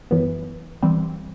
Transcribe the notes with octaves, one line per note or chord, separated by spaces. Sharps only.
F#2 E3 B3
E3 G3 C4